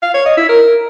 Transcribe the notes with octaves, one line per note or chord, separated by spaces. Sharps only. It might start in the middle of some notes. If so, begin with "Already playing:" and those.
F5
C#5
D#5
E4
A#4